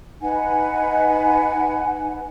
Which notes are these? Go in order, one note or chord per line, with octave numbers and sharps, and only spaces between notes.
D#4 B4 F#5 G#5